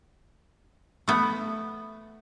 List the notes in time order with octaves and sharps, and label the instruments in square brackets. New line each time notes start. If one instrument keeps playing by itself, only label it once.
[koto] A3 B3